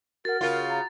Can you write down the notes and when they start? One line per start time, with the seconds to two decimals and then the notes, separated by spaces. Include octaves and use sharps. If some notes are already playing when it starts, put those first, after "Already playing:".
0.25 F#4 A#4 F#5 A6
0.41 C#3 F4 A#4
0.70 A#5